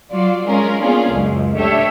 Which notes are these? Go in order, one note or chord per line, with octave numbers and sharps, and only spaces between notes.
F#3 F4 D5
G#3 C#4 F4 G#4 A#4
A#3 B3 C#4 D4 F4 G#4
C#2 F#2
A3 D4 G4 A4 C#5 E5